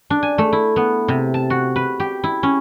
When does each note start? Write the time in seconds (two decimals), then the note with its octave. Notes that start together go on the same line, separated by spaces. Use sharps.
0.10 D4
0.23 G#5
0.38 A3
0.53 E4
0.76 B3
1.08 C3
1.34 A5
1.50 F#4
1.76 B4
2.00 G4
2.24 E4
2.43 C#4